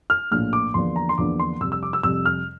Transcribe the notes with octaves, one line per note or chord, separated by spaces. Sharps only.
F6
A#1 A2 F3 A#3 F6
D6
E2 D3 F3 A#3 D4 C6
A#5
C6
E2 D3 F3 A#3 D4 D6
C6
F2 C3 G3 E6
E6
D6
E6
F2 C3 G3 E6
F6